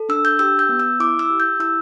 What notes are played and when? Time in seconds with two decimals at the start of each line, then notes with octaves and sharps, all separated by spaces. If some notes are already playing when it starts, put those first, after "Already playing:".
Already playing: A4
0.09 D4 E6
0.25 G6
0.39 G4 E6
0.59 G6
0.69 B3
0.80 E6
1.00 E4 D6
1.19 E6
1.30 G4
1.40 G6
1.60 E4 E6